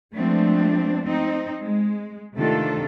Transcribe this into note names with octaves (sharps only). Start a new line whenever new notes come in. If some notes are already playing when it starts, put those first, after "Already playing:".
F3 G#3 A3 B3 C4 D4
C4 D#4
G#3
C3 D#3 A3 D4 F4 A4